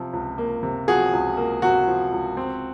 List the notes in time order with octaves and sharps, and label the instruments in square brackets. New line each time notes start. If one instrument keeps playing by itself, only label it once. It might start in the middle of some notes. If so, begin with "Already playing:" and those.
Already playing: [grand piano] C3 F3
C#2
A#3
C3
F3 F#4 G#4
C#2
A#3
C3 F#4
F3
C#2
C4